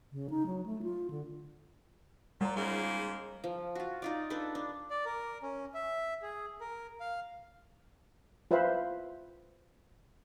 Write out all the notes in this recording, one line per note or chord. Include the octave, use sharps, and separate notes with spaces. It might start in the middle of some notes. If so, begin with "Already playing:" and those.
C#3
D#4
F#3
A3
F4
D3
A#2 G3 A#5
G#2 C#3 A#3
F3
F4 F#4
D#4 F4 D5
D4 D#4 A4 B4
D4
D5
A#4
C#4
E5
G#4
A#4
F5
F4 B4 C5 E5 F5 B5